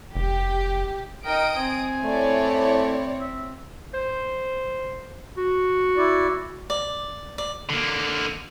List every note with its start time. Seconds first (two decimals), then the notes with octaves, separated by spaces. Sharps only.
0.15 F1 G4
1.25 D#4 A#4 G5 D#6 D7
1.57 C4 G#5
2.04 A3 E4 C#5 D5
3.21 E5
3.94 C5
5.37 F#4
5.97 E4 D5
6.70 D5
7.38 D5
7.70 D3 A#3